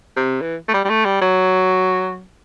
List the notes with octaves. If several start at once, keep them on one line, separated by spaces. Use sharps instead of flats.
C3
E3
A3
G3
G3
A3
G3
F#3